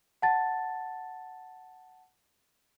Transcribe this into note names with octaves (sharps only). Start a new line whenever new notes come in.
F#5 A5 A6